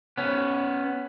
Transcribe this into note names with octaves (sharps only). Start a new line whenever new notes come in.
B3 C#4